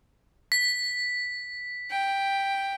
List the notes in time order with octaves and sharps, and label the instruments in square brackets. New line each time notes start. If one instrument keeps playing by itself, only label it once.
[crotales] B6
[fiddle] G5